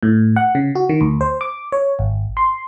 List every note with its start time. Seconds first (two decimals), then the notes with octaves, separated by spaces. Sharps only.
0.03 A2
0.36 F#5
0.55 C#3
0.75 F#4
0.89 D#3
1.01 D2
1.21 C5
1.41 D6
1.72 C#5
1.99 G#1
2.37 C6